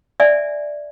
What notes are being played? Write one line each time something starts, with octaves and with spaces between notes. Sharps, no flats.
D5 E5 G#5